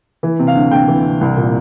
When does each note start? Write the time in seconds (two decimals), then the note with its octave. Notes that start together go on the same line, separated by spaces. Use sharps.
0.23 E3
0.39 C3
0.47 F5
0.55 D2
0.71 D2 G5
0.88 E3
1.05 C3
1.21 C2
1.37 A#2